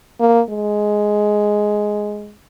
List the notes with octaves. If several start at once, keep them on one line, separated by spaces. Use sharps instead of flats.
A#3
G#3